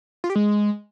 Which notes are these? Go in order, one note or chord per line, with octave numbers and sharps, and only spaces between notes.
F4
G4
G#3